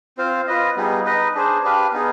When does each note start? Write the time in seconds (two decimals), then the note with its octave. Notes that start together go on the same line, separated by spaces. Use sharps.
0.18 C4 F4 C5 F5
0.47 F4 B4 D#5
0.76 G3 B3 D#4 G#4
1.05 D#4 B4 D#5
1.34 D4 G#4 C5
1.63 D4 G4 B4 F5
1.92 B3 D#4 G#4